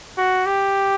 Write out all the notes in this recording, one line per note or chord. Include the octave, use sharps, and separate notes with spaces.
F#4
G4